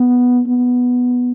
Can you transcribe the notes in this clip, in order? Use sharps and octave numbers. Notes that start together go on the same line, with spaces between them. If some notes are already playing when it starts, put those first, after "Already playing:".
Already playing: B3
B3